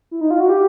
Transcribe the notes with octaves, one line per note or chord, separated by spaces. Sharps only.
E4
D#4
F4
F#4
G4